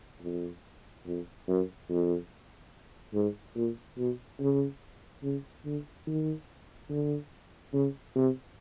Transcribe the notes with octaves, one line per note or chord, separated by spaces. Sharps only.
F2
F2
F#2
F2
G#2
A#2
B2
C#3
C#3
D3
D#3
D3
C#3
C3